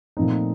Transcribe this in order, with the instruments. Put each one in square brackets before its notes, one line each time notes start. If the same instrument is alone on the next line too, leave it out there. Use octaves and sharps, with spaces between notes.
[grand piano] A#2 F3 A3 C4 D#4